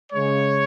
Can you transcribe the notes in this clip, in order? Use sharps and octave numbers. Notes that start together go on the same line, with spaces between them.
C#3 G#3 C#5